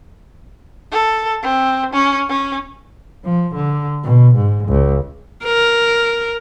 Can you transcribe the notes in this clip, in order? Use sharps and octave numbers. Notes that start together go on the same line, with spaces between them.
A4
C4
C#4
C#4
F3
D3
B2
G#2
C#2
A#4